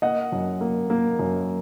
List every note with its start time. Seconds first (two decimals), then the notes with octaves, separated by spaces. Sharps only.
0.02 A#3 D#5 F#5
0.32 F#2
0.61 A#3
0.90 A#3
1.19 F#2